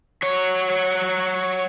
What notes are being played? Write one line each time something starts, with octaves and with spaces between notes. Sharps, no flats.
F#3 C#5